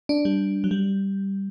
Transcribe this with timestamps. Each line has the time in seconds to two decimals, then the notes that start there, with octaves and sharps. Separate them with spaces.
0.09 D4
0.25 G3
0.64 F#3
0.71 G3